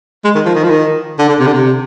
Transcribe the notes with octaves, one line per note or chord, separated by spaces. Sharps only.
G#3
D#3
F3
D#3
F3
D#3
D3
D3
C3
D3
C3